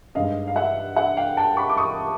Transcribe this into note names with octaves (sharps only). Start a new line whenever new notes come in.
G2 D#3 G#3 D#5 F5
F5
E5 F#5
E5 F#5
F5 G5
G5 A5
B5 C#6
D6
C#6 D#6